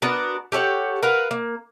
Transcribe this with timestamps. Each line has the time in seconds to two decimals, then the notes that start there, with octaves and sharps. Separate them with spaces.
0.02 B3 D4 F#4 A#4
0.52 G4 A4 C#5 F#5
1.03 A#4 B4 F5 F#5
1.31 A#3